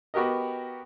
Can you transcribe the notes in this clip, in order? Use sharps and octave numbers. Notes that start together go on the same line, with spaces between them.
B3 F#4 G4 A#4 D#5